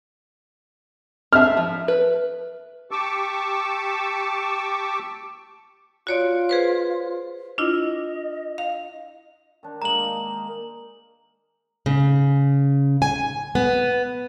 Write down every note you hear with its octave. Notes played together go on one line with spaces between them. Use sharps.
C4 G#4 E5 A5 F6
F3
B4
G4 A5 C#6 D6 E6
F4 F#4 C#5 D5
G#4 B4 C5
D4 E4 F4 D#5
F5
D#3 D4
G#3 A#3 D#4 A#5 F#7
C#3
G#5
B3